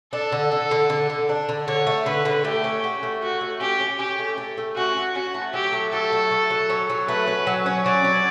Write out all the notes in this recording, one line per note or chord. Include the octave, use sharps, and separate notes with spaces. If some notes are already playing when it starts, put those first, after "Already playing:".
D4 A4
D3
D3
D3
D3
D3
D4
D3
D3 C#5
A3
D3 B4
D3
A3 G4
C#4
F#4
A3
C#4 F#4
A3
C#4 G4
C#4
C#4 G4
A3
A3
A3
C#4 F#4
C#4
C#4 F#4
A3
F#3 G4
A3
F#3 A4
A3
A3
F#3
C#4
F#3
A3 B4
C#4
F#3
C#4
F#3 D5
C#4